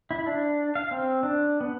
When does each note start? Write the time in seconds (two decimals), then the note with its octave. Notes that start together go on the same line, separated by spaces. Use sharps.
0.11 E4
0.26 D4
0.75 F5
0.91 C4
1.23 D4
1.61 B3